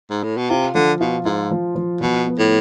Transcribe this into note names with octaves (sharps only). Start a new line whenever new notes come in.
G#2
A2
B2
C3 F4
D3 F3
B2 F4
G#2 F4
F3
F3
B2 F3
B3
A2